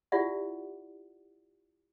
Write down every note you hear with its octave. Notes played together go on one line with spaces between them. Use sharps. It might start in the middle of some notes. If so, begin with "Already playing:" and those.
E4 F4 G4 D5 E5 F#5